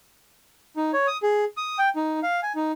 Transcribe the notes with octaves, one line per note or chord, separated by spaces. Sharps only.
D#4
C#5
D#6
G#4
D#6
G5
D#4
F5
G#5
D#4